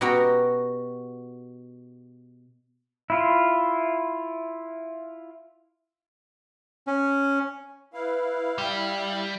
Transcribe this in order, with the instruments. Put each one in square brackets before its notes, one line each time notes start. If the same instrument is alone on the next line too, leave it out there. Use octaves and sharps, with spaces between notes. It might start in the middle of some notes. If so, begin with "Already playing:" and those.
[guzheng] B2 F#4 G4 G5 A#5
[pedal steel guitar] E4 F4
[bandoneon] C#4
[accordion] E4 F5 [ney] B4
[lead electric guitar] G3 [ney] G5